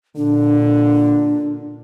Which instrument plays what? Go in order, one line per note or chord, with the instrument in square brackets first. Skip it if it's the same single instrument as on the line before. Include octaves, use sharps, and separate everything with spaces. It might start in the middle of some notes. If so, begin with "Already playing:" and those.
[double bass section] A#2 [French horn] D3 [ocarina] D4